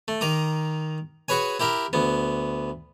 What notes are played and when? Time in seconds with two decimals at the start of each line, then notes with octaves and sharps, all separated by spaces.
0.08 A3
0.21 D#3 A#5 D6 D#6
1.28 F#4 G#4 B4 C#5 G#5
1.60 E4 G4 A#4 E5
1.93 D2 B3